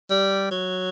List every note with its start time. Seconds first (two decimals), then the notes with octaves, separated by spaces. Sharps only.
0.10 G3
0.51 F#3